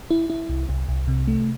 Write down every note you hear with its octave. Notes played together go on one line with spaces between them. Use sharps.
E4
E4
C2
C2
C2
C3
A3